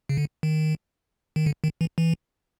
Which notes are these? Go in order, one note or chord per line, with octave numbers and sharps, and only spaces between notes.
C#3
D3
D#3
D#3
D3
D#3
E3
E3